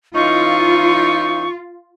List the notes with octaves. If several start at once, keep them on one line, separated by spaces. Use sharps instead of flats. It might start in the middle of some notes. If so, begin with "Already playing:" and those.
E3 C#4 D#4 F4 C#6